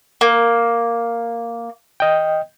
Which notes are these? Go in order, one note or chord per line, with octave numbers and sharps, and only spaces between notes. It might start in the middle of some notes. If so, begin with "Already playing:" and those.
A#3
D#5 G5